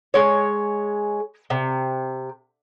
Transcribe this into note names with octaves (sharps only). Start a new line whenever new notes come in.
G#3 C#5
C3